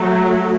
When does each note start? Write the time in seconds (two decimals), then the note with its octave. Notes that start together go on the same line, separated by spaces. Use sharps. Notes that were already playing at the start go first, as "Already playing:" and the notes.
Already playing: F#3 A3